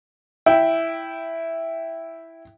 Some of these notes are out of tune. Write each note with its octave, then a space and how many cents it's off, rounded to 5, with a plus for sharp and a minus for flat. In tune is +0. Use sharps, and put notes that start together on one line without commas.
E4 +0 G5 +0